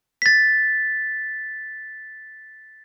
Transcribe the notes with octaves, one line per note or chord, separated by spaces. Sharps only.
A6 B6